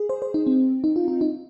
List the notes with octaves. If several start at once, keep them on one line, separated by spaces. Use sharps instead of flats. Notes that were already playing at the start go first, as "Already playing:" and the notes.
Already playing: G#4
C5
C5
D#4
C4
D#4
F4
F4
D#4